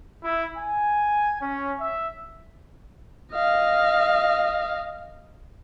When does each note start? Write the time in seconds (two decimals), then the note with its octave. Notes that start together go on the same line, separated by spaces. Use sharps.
0.24 E4
0.57 G#5
1.42 C#4
1.80 E5
3.33 D#5 F5